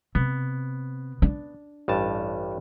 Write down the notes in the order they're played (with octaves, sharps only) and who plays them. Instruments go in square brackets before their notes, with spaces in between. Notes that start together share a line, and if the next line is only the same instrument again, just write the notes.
[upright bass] C3 [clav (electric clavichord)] B3
[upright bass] D4
[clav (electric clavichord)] A1 G2 A5